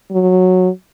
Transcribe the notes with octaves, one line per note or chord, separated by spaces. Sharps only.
F#3